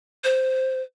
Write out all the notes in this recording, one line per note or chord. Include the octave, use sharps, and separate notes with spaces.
C5